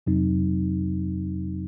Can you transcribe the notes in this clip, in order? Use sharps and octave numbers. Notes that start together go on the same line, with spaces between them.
F2 C3 F#3 C4 D#4